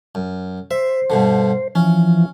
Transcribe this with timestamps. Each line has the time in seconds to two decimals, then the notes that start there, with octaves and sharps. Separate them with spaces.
0.15 F#2
0.71 C5 E5
1.10 G2 B2 D3
1.75 E3 F3 C#4